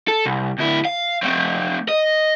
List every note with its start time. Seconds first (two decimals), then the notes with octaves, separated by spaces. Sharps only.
0.09 A4
0.26 C2
0.58 D2 E4
0.85 F5
1.23 A3 C4
1.89 D#5